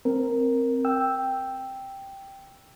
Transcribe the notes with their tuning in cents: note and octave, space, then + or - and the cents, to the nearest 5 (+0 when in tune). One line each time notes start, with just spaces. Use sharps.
C4 +5 A#4 +0
G5 +0 E6 +0